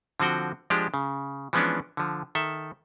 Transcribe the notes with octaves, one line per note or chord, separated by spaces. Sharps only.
D3 F3 C4 F#4 G5
F3 G#3 D4 G4
C#3
E3 F3 G#3 B3 C#4 D4
D3 F3
D#3 A4 E5